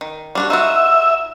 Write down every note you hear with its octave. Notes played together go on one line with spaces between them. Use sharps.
D#3
G3 D4 F#4
D#4 F4 F#4 E5 E6